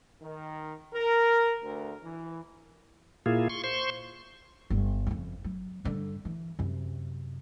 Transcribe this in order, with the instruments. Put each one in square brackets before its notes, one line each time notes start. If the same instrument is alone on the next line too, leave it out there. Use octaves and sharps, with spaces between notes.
[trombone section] D#3
A#4
D2
E3
[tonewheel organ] A#2 A#3 E4 F4 G#4
C6 C#6
C5 C6 C#6
[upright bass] G1 G3
F2 C#3
F#3
G2 D3
E3
F#2 C3